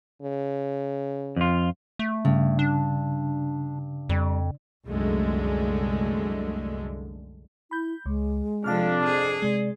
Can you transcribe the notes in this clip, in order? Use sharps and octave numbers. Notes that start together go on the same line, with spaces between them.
C#3
F2 F4
A3
G2 C#3
D4
F2 G3
C2 F#2 D3 G#3 A3
E4 B5 G6
C#2 G#3
F2 C3 F3 D4 F5 A5 F6
G#4
C3 G#3 D5